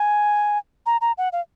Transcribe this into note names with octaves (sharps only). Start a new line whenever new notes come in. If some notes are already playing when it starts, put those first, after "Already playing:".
Already playing: G#5
A#5
A#5
F#5
F5